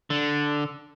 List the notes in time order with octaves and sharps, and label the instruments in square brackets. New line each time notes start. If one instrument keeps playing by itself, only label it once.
[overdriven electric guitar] D3